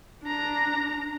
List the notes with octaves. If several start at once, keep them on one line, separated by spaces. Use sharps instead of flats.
D4 A#5